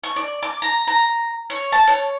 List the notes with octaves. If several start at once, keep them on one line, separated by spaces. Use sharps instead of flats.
C#6
D5
D6
A#5
A#5
C#5
A5
C#5